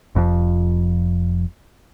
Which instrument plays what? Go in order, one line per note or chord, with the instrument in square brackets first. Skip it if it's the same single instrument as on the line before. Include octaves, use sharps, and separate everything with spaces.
[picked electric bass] F1 F2 A#2 F3